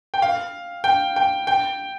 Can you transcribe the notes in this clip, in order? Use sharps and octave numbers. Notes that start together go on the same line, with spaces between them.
G5
F5
G5
G5
G5